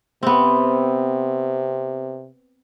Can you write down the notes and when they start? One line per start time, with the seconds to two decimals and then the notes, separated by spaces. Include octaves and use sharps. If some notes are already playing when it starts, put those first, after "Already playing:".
0.23 C3 B3 C4